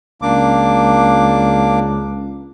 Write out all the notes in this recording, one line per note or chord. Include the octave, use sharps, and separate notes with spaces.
C#2 A#3 D4 D6